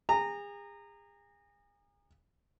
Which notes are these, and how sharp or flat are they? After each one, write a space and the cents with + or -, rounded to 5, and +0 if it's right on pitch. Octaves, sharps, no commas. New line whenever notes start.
G#4 -35 A#5 -15